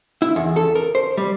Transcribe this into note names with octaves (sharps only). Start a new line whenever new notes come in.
E4
E2
A4
A#4
C5
G3